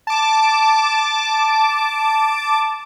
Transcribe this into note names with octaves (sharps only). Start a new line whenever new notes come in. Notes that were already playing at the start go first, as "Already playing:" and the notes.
A5 D6